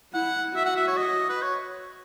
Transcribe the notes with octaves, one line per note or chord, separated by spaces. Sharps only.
E4 F#5
F#4 E5
F#5
E5
C#5
D#5
B4
C#5